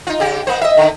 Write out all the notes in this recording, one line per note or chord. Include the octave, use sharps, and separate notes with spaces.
D#4 F4
C#3 G4
A#3 C5
D#5 E5
D3 D#3